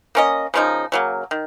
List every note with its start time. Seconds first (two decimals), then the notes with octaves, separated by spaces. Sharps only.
0.15 A#3 C#4 A4 D#5
0.54 C#3 F3 A#3 D#4
0.92 C#3 F#3 A#3
1.31 D#3